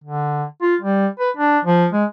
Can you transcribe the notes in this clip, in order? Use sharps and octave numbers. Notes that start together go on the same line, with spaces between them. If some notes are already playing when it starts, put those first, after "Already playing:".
D3
F4
G3
B4
D4
F3
G#3